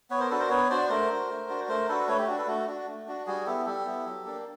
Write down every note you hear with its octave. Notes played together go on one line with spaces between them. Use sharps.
B3 B4 C#5
A#4 C5
D4 F#4 A4 B4
A#4 C5
B3 B4 C#5
D4 F#4 C5 D5
A3 A#4 C5
D4 F#4
A3
D4 F#4
A3 A#4 C5
D4 F#4 A4 B4
A3 B4 C#5
G4
D4 F#4
A4 B4
A3 F#4
D4 F#4
A3
D4 F#4
G3 F#4 G#4
B3 E4 G4 A4
G3 G4 A4
B3 E4
F#3
A#3 D4